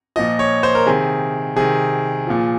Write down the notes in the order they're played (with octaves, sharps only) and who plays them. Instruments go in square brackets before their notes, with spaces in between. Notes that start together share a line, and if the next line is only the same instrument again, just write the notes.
[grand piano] A#2 F3 D#5
C#5
C5
A#4
C3 D#3 G#4
C3 D#3 G#4
A#2 F3